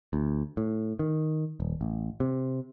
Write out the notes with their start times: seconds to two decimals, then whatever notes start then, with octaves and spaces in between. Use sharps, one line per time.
0.13 D2
0.57 A2
0.99 D#3
1.60 D#1
1.81 A1
2.20 C3